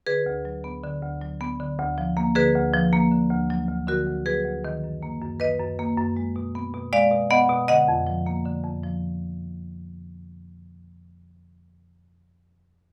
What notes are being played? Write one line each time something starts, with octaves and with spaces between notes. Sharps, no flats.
D3 G#4 B4
D2
F#3
B3
D3
D2
F#3
B3
D3
D2
F3
A#3
D3 G#4 B4
D2
F3
A#3
D3
D2
F#3
D2
D3 F#4 A#4
D2
F#3 G#4 B4
D2
D#3
F#2
A#3
F#2
D#3 B4 D#5
F#2
A#3
F#2
G#3
B2
B3
B2
G#3 D5 F5
B2
B3 D#5 F#5
B2
D3 D#5 F#5
F2
F3
A#3
D3
F2
F3